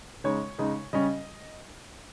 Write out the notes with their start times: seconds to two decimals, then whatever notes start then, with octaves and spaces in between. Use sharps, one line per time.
0.24 C#3 G#3 D#4 C#5
0.58 C#3 G#3 D#4
0.93 C#3 G3 C#4 D#5